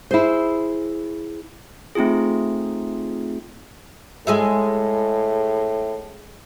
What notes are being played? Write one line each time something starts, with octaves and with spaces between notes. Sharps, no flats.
E4 G#4 C5
A3 C4 D#4 F4 G#4
A2 G#3 G#4 E5